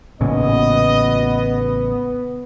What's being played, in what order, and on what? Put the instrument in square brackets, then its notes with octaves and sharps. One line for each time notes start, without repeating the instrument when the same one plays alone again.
[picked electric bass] A1 A#2 C#3 [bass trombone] B3 [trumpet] D#5